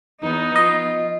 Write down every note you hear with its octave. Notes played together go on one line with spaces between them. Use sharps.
E2 B3 D#4
F3 F4 D#5